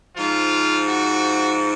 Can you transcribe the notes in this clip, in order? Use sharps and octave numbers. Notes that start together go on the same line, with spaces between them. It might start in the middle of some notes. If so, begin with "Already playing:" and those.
G#2 F3 F4
F#4